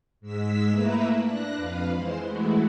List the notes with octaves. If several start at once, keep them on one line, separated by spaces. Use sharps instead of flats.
G#2 G#3 E6 B6
A3 A#3 E4 A#4 B4 E5
D4 F#6 A#6
F2 B4 F5
E3 G#3 C5 C6
E3 G#3 A3 E4 F#4